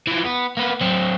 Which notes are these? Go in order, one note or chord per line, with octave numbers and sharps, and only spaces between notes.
E3 F3
B3
A#3 B3
F#3 C4